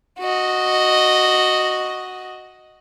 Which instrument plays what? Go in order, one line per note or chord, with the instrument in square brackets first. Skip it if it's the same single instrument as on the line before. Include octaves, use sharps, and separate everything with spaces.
[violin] F#4 D#5